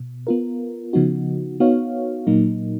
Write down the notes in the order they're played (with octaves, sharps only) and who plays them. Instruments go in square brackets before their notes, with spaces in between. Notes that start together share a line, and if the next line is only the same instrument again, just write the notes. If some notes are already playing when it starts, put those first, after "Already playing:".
Already playing: [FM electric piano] B2
B3 F4 A#4
C#3 F3 B3 D#4 F#4
B3 D#4 F#4 C#5 F5
A#2 F#3 A#3 D#4